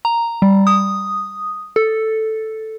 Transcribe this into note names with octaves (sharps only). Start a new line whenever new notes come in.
A#5
G3
D#6
A4